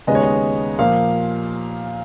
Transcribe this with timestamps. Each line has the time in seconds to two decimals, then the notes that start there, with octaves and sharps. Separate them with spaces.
0.07 D#2 C#3 G#3 B3 D#5
0.15 C#5
0.22 D#5
0.79 A#2 F3 A#3 F5